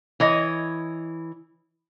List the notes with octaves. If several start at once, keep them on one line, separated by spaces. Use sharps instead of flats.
E3 C#5 D#5